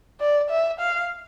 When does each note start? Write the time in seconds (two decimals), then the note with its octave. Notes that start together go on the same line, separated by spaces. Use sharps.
0.21 D5
0.51 E5
0.80 F5